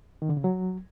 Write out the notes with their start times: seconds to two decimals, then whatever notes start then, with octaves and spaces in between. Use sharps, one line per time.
0.22 D#3
0.29 D3
0.37 C#3
0.44 F#3